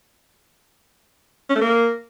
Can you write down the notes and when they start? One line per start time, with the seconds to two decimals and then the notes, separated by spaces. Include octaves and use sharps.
1.50 C#4
1.55 A3
1.61 A#3